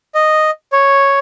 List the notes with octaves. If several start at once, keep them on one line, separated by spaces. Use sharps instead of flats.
D#5
C#5